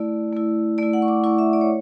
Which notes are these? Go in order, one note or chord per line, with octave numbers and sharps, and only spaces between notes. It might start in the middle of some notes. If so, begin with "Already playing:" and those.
Already playing: A3 E4 D5
A3 E4
A3 E4 D5
F#5
C#6
D6
A3 E4 C#6
E5
D5
C#5